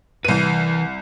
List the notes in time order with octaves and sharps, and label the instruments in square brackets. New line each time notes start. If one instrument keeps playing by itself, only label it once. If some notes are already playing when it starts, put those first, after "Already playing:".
[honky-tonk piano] C2 D#7 [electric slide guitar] E3 B4